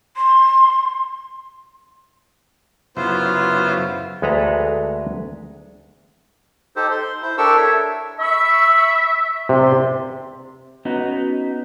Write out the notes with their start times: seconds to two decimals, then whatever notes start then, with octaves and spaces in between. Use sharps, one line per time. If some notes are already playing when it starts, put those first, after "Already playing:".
0.16 C6
2.97 F#2 C#3 B3 E4 F4 C5
4.22 D2 G#3 A4 B4 A#5
6.76 D#4 G4 A4 C5
6.91 C6
7.22 E4 C5
7.38 D4 G4 A4 A#4 C#6 E6
7.57 A4 C#5 E5
8.20 E5 B5 C#6 E6
9.49 C3 D5 C6
10.85 B3 C#4 D#4 F#4